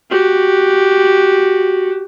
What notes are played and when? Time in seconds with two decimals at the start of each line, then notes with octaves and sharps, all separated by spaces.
0.10 F#4 G4